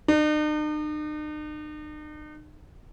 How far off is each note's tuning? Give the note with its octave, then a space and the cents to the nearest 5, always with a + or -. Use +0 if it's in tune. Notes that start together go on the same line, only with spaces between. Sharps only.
D#4 -45